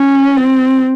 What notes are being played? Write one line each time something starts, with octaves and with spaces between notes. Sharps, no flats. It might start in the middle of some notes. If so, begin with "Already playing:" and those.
Already playing: C#4
C4